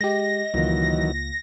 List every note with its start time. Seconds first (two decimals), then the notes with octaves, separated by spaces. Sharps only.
0.01 G#3 G4 D#5 A#6
0.54 C#2 D#3 E3 F#3 A#3 F4